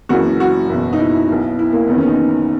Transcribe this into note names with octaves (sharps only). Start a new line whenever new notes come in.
F#1 F#2 E3 F#4
F#4
F#1 E2 B2
D#4
E4
B1 B2
E4
A#3
F#1 E2 D#3 B3
C#4
D#4